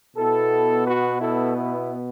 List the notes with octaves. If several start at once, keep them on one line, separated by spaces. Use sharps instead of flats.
B2 B3 E4 A4
F#4 B4
E4 A4
E4